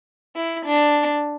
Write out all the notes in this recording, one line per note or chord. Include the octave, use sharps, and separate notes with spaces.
E4
D4